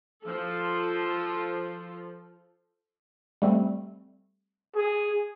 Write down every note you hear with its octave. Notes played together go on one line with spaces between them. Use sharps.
F3 A4
G3 A3 C4
G#4